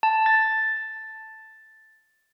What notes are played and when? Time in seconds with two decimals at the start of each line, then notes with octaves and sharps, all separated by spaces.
0.03 A5
0.26 A6